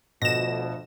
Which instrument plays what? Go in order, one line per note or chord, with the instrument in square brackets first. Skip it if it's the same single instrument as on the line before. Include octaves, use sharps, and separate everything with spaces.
[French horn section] D2 F3 [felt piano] B2 [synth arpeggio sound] A#6 E7